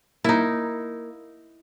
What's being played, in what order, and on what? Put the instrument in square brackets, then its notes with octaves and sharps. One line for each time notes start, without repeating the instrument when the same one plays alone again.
[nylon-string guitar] A#3 [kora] D#4 E4